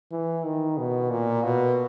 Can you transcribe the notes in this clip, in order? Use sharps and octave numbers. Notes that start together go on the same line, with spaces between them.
E3
D#3
B2
A#2
B2